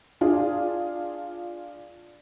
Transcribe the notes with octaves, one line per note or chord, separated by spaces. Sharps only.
D4 F4 G#4 D5